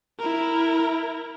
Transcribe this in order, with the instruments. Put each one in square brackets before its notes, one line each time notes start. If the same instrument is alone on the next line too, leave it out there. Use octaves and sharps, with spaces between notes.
[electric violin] E4 A#4